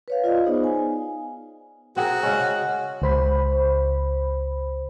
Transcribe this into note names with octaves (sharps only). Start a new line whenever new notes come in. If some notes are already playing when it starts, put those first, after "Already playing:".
B4 C#5 F5
F4 D5 D#5 F5
B3 D#4 G#4 C5
G#5
C4 F#4 G#4 A#4
C#3 G#3 C#4
C#2 C5 B5